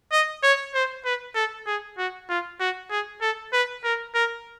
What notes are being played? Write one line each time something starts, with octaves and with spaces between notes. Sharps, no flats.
D#5
C#5
C5
B4
A4
G#4
F#4
F4
F#4
G#4
A4
B4
A#4
A#4